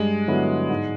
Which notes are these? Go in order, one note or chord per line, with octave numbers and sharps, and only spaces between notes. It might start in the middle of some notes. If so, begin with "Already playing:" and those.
Already playing: G2 G#3
D3 F#3 B3 E4
G#2